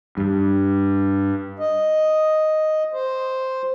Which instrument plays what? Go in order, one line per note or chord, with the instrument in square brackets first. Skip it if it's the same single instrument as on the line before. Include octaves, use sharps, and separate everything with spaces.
[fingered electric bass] G2
[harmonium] D#5
C5